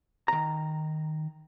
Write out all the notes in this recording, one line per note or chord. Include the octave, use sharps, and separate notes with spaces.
D#3 A#5